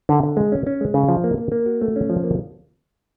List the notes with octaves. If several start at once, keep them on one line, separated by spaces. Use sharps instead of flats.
D3
D3
G#3
C#4
C#4
G#3
C#3
F3
A#3
A#3
A#3
F#4
A3
C#4
F3
A#3